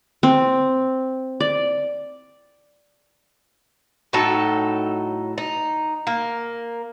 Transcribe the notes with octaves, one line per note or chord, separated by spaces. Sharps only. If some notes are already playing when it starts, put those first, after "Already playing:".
C4
D5
A2 F#3 D#4 A4
D#4
A#3